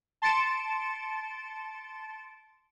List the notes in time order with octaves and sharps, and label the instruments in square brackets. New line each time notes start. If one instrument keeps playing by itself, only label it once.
[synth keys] A5 C6 A6 C#7 D7 E7